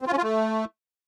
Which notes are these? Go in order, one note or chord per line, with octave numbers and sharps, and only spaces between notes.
C4
F4
C#4
F4
A3